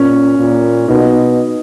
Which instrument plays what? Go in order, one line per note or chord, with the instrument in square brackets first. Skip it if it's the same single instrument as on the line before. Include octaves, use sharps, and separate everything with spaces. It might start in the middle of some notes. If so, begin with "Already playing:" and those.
Already playing: [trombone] A#2 [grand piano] C#4
[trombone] A#2
[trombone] B2 [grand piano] D#4